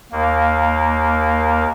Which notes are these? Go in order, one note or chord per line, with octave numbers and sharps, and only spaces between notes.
D#2 A#3